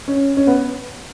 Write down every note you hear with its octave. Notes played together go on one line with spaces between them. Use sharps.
C#4
C#4
B3